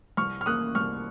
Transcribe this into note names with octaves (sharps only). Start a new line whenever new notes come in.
C2 C#6 F6
F6
A#3 D#6 F#6
C2 C#6 F6